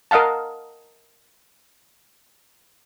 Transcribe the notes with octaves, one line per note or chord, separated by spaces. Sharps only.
A#4 D#5 F5 F#5 A5